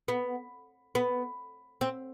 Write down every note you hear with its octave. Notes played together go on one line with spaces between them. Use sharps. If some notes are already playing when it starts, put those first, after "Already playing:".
B3
B3
C4